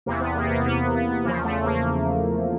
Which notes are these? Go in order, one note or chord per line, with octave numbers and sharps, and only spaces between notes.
E2 C3 E3 A#3
B3
A#3
B3
A#3
B3
B3
B3
E2 C#3 F3 A#3
A3
A#3